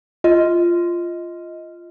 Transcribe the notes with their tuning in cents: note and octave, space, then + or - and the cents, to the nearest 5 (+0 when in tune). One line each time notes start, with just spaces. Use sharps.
F4 -10 D#5 +15